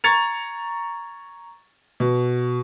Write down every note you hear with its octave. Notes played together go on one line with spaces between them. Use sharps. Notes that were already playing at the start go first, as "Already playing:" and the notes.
A#5 C#6 G#6 A6 C#7 F7
B2